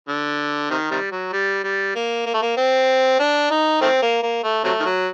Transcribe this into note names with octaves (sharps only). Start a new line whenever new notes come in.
D3
C3 D#3
C3 D#3 G3
F#3
G3
G3
A#3
A#3
A3
A#3
C4
D4
D#4
D#3 A3 C4
A#3
A#3
A3
C3 F#3 A3
D#3
F#3